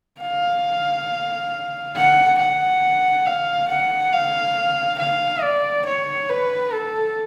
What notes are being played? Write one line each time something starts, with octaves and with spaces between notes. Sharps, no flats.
F5
F#5
F#5
F5
F#5
F5
F5
D5
C#5
B4
A4